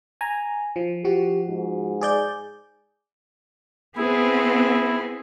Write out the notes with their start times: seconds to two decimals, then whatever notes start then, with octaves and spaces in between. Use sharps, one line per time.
0.21 G#5 A#5
0.76 F3
1.05 F3 F#4 G4
1.48 G#2
2.01 G#4 D5 G6
3.97 B3 C4 E4 G#4